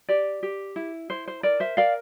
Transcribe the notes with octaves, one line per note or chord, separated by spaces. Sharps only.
G4 D5
G4
E4
E4 C5
C5
A#4 D5
C5 E5
A#4 D5 F5